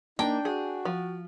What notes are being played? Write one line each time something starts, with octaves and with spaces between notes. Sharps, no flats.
A#3 D4 D#4 G5
F#4 G#4
F3